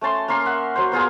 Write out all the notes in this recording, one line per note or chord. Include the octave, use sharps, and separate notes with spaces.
A3 C#4 A5 C6
A#3 C#4 A#4 C6
E5 F#5
F#3 C5
B3 F4 G#4 A#4